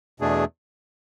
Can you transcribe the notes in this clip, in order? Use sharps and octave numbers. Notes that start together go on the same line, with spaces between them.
E2 B2 A3 D4 G#4